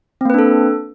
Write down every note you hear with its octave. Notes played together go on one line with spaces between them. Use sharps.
A#3 C4 D4 A4 B4